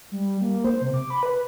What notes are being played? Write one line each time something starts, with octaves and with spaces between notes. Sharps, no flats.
G3
A#3
C5
C3
D6
B5
B4